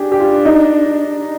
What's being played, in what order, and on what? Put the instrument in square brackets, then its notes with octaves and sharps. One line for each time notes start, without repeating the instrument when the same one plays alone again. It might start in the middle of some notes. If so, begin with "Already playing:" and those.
Already playing: [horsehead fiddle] D4 [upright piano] G4 G#4
[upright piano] G4
F4
D#4